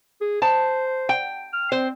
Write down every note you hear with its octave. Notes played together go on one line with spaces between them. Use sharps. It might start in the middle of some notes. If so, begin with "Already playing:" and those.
G#4
C5 A5
G5
F6
C4 C5